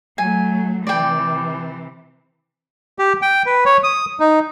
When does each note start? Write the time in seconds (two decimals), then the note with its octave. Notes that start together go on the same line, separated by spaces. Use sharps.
0.18 F#3 A3 G#5
0.87 C3 E3 D5 G5
2.99 G4
3.22 G5
3.46 B4
3.65 C#5
3.83 D#6
4.20 D#4